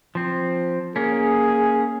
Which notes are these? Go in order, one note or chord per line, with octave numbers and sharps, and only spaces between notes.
F3 C4
A#3 C#4 G#4